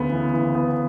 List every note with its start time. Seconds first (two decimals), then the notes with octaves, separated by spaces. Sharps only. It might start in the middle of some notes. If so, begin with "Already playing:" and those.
Already playing: D2 C#3 B3
0.12 E3
0.33 E3
0.55 B3